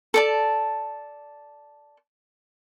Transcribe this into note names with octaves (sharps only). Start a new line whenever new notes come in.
A4 D5 A5